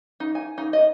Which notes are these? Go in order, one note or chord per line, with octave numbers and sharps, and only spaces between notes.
D#4
G#5
D#4
D#5